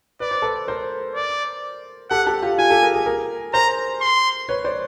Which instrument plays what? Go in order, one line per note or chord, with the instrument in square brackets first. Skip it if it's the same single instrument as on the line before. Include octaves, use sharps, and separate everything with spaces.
[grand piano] B4 [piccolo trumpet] D5
[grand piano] C5
A4 B4
A#4 C5
[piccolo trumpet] D5
[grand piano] G4 A4 [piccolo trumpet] F#5
[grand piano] G4 A4
F4 G4
[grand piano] F4 [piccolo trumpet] G#5
[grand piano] G4 A4
G#4 A#4
G#4 A#4
G#4 A#4
[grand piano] A#4 C5 [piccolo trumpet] A#5
[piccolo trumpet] C6
[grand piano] B4 C#5
C5 D5